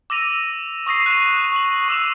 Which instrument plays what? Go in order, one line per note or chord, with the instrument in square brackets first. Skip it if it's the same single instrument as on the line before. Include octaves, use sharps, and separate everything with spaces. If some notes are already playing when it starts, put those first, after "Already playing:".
[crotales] D6 E6 A#6 D#7 F7
C#6 D#6 A#6 C7
F#6 A#6 D#7 E7
C#6 F#7
C#6 D6 E6 E7 F7